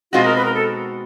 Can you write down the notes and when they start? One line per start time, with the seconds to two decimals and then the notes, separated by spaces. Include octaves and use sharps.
0.12 B2 G#3 C4 D#4 F4 F#4
0.24 A#4
0.36 B4
0.45 A#4
0.54 A4